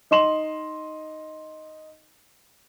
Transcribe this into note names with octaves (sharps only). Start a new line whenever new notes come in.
D#4 D#5 C6 E7 F#7